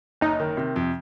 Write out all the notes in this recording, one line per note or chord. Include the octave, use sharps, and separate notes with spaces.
F#1 D#4
D#3
C3
F2